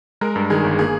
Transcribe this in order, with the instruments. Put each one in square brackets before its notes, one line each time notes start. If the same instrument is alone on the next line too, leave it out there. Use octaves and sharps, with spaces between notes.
[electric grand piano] G#3 [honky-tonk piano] A#4
[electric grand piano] G2
[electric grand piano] D#3 [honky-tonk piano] G#4
[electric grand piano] G1
[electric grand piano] A#3 [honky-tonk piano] G#4